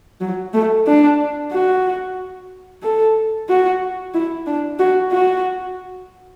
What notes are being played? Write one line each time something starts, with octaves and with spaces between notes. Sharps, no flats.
F#3
A3
D4
F#4
A4
F#4
E4
D4
F#4
F#4